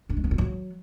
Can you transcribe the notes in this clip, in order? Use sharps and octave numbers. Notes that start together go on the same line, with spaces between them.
D4
G#3
B3
F4
F#3